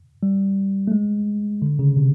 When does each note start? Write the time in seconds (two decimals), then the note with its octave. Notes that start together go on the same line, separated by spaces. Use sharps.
0.23 G3
0.88 A3
0.92 G#3
1.62 D3
1.79 C#3
1.97 C3